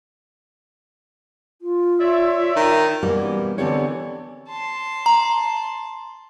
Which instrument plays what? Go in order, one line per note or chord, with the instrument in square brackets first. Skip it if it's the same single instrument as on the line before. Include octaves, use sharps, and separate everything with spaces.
[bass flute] F4
[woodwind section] C#5 D5 E5
[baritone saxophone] D#3
[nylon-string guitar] B2 E3 G3 A#3 C#4
D3 E3 B3 C4 G4 C#5
[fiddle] A5 C6
[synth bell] A#5